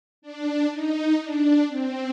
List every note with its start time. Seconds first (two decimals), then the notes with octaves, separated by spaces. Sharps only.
0.22 D4
0.71 D#4
1.19 D4
1.68 C4